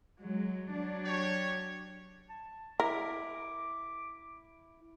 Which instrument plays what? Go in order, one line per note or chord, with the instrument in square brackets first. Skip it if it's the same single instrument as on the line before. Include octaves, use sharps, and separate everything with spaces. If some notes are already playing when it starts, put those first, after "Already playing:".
[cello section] F#3 G#3
F#3 D4
[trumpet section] G4 C#5
[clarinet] A5
[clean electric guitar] E4 [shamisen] A#4 [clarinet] D6